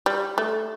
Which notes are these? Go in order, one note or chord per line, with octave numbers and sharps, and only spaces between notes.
G3
A3